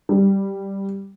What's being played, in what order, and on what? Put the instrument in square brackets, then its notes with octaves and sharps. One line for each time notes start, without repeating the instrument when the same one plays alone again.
[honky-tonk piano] G3